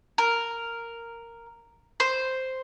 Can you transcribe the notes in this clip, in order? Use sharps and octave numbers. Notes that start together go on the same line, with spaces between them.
A#4
C5